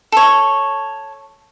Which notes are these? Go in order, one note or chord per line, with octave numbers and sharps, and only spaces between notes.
A4 C#5